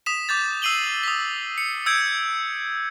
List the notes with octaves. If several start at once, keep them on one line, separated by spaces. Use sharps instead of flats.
D#6 B6 E7
D6 G6 A6
E6 C7 D#7 F#7 G7
D#6 B6
C#7
E6 G6 G#6 D7